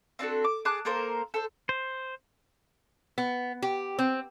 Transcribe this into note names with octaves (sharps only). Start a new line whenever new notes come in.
C4 D4 F#4 A4
D6
G#4 A5 D6 F#6
A#3 A4 A#4 C5
A4 C5
C5
B3
G4
C4